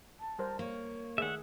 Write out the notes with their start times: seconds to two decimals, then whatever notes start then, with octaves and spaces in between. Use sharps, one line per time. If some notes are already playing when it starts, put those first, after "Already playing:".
0.19 A5
0.39 G3 A#4 C5
0.59 A#3 C#5
1.18 D#3 A3 G#4 E5 F#5